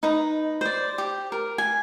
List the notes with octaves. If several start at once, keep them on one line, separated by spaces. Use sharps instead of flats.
D#4 B4 A#5
C5 D5
G4
A#4
G#5